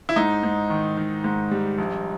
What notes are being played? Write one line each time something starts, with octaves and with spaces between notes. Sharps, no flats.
E4
G#2 D#4
G#2
D#3
D#3
G#2
G3
A#1